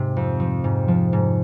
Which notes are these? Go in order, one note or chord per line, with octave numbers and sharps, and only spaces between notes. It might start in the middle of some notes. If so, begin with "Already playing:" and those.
Already playing: G#2 C3
F2
F3
G#2
F3
G#2